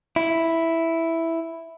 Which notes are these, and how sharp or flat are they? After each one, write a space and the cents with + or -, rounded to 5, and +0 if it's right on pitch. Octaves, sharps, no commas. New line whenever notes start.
E4 +0